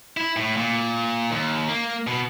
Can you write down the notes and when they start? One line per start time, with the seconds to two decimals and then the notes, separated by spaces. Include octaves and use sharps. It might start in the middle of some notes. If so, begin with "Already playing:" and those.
0.17 E4
0.36 A2
0.57 A#2
1.31 D#2
1.69 A#3
2.07 B2